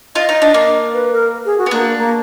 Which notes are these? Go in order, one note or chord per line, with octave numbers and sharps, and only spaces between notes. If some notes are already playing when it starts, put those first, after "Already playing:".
F4 D#5
D#4
D4
A#3
B4
A#4
G#4
F#4
B3
A#3 D4
A#3